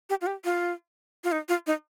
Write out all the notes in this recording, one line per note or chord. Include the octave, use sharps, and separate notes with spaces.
G4
F4
G4
F4
F4
D#4
F4
D#4